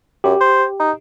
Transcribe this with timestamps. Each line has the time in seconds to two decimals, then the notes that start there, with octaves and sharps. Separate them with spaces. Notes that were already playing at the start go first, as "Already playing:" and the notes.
0.24 F#2 G4
0.41 C5
0.80 D#4